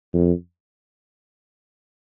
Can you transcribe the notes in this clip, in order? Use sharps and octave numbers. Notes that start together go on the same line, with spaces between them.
F2